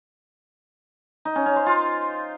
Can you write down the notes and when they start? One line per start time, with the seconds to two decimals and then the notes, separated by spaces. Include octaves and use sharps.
1.25 D#4
1.36 C#4
1.46 C#4
1.56 C5
1.66 F4